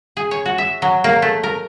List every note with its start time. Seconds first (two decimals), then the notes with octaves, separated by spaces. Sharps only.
0.17 G#4
0.31 C#5
0.46 F#4
0.58 E5
0.82 F#3
1.04 A#3
1.22 A3
1.44 A#4